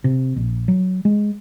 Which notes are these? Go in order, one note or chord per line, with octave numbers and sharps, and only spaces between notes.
C3
A#1
F#3
G#3